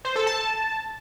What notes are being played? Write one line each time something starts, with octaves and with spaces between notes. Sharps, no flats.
C5
A4
A5